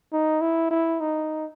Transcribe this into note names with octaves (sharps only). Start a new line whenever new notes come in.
D#4
E4
E4
D#4